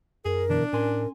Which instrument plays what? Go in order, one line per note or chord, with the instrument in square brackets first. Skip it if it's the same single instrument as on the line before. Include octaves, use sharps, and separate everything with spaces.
[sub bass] F#2 [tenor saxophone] G#4 [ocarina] A#4
[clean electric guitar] B2 D3 E3 [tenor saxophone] D4
[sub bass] A2 [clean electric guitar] C#4 G#5 C6 [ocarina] A#4